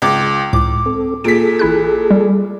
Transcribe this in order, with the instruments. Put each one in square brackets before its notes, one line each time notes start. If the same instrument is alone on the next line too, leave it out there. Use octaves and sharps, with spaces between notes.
[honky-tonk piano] C#2 D6
[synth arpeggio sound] C#2 A2 [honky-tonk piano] D6
[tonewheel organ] C4 A4
[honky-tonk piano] A#2 B6 [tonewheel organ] G#4 A4 [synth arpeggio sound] D7
[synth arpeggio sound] A1 E4 F#6
G3